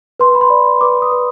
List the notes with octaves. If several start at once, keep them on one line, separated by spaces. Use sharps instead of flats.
B4 C6
B5
C6
D5
B4 D6
D#6
B4